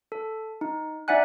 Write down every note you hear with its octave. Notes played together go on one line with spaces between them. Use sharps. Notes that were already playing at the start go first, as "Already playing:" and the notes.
A4
D#4
D#4 D5 E5 F#5 G#5 F#6